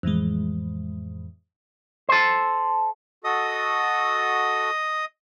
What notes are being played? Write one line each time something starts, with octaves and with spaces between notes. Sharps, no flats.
F2 A2 E3 G#3
A4 C5
F#4 A4 D#5 D#6